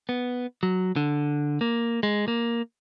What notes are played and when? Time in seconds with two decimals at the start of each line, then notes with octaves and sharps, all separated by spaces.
0.09 B3
0.63 F#3
0.96 D3
1.61 A#3
2.03 G#3
2.28 A#3